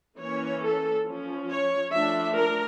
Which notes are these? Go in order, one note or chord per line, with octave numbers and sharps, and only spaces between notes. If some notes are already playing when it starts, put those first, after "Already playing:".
E3 A#3 C#4 C#5
A4
F3 C#4
C#5
F3 A3 D4 E5
A#4